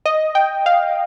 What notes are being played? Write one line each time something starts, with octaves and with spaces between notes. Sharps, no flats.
D#5
G5
F5